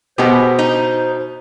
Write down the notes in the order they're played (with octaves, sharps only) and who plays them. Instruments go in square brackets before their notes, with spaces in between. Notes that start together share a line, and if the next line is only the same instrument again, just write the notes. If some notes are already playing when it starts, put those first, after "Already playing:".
[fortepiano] B2 G4 [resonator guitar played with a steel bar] G#3 B3 [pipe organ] C5
[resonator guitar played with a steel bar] D#4